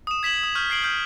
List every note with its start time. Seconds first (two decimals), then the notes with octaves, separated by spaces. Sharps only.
0.07 D#6 E7
0.23 G#6 B6 E7 F#7
0.43 D#6
0.55 C#6 F6 G6
0.70 B6 C7 D7 F#7
0.84 F6 G6